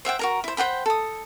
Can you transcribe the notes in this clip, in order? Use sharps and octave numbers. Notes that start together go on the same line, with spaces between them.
C5 E5 F#5 G5
F#4 A#4 A#5
E4 C5
C5 F#5 G5 B5
A4 D#6